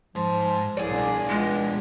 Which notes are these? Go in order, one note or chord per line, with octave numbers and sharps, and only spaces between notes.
G#2 F3 C5
C2 G#4 D5
B2 D4
C#2 G#3